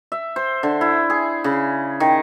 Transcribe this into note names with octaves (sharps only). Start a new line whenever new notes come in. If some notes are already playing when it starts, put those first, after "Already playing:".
E5
C5
D3
E4
G#4
C#3
D#3